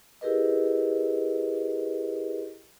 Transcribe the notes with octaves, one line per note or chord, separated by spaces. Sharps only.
E4 G4 G#4 A#4 B4 D#5